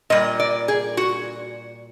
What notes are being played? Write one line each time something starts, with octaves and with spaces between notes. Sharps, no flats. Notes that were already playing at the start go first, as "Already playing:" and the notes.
A#2 G3 D#5
D5
G#4
F#4